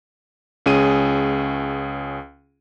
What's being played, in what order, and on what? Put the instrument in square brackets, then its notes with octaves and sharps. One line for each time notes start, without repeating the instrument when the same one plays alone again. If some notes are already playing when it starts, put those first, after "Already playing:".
[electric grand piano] C#2 C#4 G#4 D#7